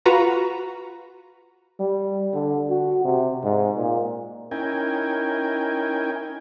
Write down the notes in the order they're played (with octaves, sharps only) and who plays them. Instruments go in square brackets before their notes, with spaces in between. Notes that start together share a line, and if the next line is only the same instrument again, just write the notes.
[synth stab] F4 F#4 B4 A#5
[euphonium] G3
D3
F#4
C3
G#2
A#2
[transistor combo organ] C#4 D#4 E4 A#4 G5 G#5